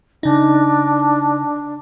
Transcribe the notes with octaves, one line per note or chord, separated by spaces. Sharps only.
C#3 D4 D#4